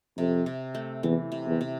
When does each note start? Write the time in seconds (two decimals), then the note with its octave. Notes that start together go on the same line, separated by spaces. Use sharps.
0.17 F2 C3
0.46 C3
0.75 A3
1.03 E2 E3
1.32 C3
1.47 E2
1.61 C3